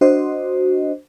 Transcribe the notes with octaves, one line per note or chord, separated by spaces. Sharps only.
D4 F#4 C5 D#5